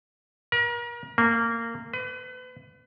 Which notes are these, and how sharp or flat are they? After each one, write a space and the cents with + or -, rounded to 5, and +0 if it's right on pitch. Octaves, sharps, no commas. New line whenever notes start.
A#4 +40
A#3 -20
B4 +35